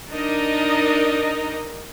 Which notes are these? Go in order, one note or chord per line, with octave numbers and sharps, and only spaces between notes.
D4 D#4 A#4 D#5